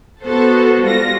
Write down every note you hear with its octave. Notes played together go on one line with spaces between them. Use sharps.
B3 F#4 A4 C5
G3 F4 A#6